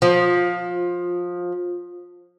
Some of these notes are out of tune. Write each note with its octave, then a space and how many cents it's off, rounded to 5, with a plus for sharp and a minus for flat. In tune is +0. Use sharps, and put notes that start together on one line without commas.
F3 +20